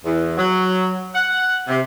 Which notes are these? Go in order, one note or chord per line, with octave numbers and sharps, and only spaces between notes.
E2
F#3
F#5
C3